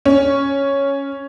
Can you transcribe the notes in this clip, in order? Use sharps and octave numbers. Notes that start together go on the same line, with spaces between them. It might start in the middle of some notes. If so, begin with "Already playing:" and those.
C#4